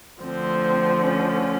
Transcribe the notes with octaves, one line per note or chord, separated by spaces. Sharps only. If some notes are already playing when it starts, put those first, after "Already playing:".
D2 D3 F3 C4
C#4